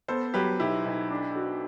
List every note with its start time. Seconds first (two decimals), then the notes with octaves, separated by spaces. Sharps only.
0.08 B3 A4 C5
0.34 F#3 G4 B4
0.60 B1 E4 G4
0.85 B1
1.10 D4
1.36 F#4